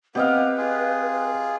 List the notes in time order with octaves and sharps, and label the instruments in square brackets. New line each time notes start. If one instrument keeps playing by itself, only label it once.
[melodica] B3 [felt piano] C4 [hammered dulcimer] G4 D#5 F5 [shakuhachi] B4
[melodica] F4 G#4